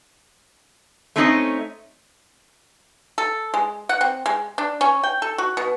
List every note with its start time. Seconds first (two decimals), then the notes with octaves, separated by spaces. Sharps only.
1.16 A3 C4 C#4 D#4 B4 D#5
3.18 A4
3.54 G#3
3.89 F#5
4.01 C4
4.26 G#3
4.58 D4
4.81 C#4
5.03 G5
5.22 A4
5.38 F#4
5.57 B2